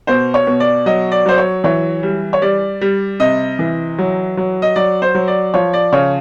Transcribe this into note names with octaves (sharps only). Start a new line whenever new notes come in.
B2 C5
C#5
B2
D5
F#3 D#5
D5
F#3 C5
C#5
E3 C#5
G3
C#5
G3 D5
G3
C3 D#5
E3
F#3
F#3
D#5
F#3 D5
C5
F#3
D5
F3 C#5
D5
C#3 C#5